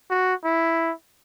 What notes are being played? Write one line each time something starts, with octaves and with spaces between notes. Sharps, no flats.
F#4
E4